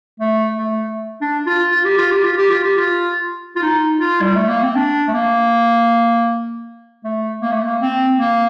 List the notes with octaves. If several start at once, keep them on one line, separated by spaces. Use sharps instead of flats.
A3
A3
D4
F4
F4
G4
F4
G4
F4
G4
F4
G4
F4
F4
D#4
F4
G3
A3
A#3
C4
D4
A3
A#3
A3
A#3
A3
A#3
C4
A#3